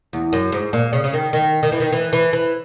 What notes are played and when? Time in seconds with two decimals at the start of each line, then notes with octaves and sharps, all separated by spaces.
0.13 E2
0.33 F#2
0.52 G#2
0.73 A#2
0.93 C#3
1.04 C#3
1.14 D#3
1.33 D#3
1.63 D#3
1.72 E3
1.80 D#3
1.93 E3
2.13 E3
2.33 E3